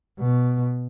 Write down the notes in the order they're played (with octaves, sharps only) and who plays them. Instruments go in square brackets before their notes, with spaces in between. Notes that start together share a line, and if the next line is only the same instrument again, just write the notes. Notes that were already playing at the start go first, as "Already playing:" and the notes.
[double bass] B2